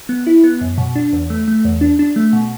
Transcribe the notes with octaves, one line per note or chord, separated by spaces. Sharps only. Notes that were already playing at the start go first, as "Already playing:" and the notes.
B3
E4
B3
F#2
B2
D4
E2
A3
A3
E2
D4
D4
A3
B2